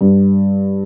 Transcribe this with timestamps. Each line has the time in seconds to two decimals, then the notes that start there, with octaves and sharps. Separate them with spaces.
0.01 G2